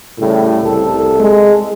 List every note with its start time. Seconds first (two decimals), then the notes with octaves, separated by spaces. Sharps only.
0.18 A2 C#3 G3
0.63 C2 A4
1.20 G#3